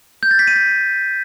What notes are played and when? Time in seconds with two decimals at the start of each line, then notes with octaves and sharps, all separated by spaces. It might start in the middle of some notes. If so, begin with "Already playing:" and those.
0.23 G6
0.31 A6
0.39 B6
0.47 D#7
0.56 B6